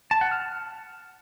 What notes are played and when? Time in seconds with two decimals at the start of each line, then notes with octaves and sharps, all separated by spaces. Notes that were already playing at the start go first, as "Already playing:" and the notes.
0.11 A5
0.21 F#5
0.31 F6